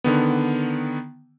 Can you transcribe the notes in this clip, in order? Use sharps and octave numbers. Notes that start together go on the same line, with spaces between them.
D3 D#3 B3